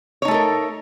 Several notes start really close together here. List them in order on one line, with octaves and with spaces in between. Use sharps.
C#5 D#4 A3 A4 A#4